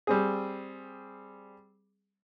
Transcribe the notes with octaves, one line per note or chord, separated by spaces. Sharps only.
G3 C4 G#4